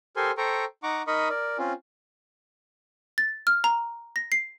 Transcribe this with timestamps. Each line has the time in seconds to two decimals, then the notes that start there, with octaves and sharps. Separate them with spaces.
0.16 G4 A4 A#4 C5 G#5 C6
0.37 A4 C5 G5 A#5 C#6
0.83 D#4 F#5 A#5 C#6 D6
1.07 D#4 A#4 D#5 B5 C#6 D#6
1.30 A#4 D5
1.58 C4 C#4 F4
3.18 A6
3.47 F6
3.64 A#5
4.16 A#6
4.32 C7